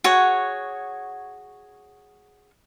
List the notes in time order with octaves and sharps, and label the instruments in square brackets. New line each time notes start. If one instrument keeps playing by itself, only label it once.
[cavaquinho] F#4 G#4 C#5 F#5